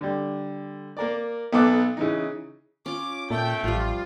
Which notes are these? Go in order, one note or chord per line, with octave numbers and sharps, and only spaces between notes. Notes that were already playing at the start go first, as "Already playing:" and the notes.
D3 G3
A#3 A#4 D5
B1 B3 A4 D6
C#3 E3 D#4
C#4 F4 D6
A#2 A3 G5
A1 F3 G3 F4